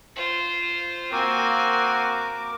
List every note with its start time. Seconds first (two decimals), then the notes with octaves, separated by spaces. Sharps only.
0.16 F4 C5
1.12 A#3 C4 F#4 A#4 G#5 D6